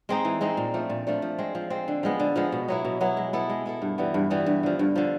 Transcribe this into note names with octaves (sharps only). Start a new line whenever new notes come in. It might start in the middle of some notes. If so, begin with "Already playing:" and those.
G#3 C4 D#4
E3
G#3 C4 D#4
A#2
F3 A3 D4
A#2
F3 A3 D4
F3
G#3 C4
F3
G#3 C4
D3
F3 G#3 B3
D3
F3 G#3 B3
B2
F#3 B3 E4
B2
F#3 B3 E4
G#3
B3 E4 A4
G#3
B3 E4 A4
G2
E3 G3 B3
G2
E3 G3 B3
G2
D3 F3
G2
D3 F3